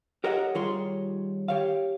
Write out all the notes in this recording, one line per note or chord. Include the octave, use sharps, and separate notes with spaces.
G4 A#4 C#5 D#5 E5 F#5
D#3 G3 F4 G#4 C#5 C6
G4 C#5 F5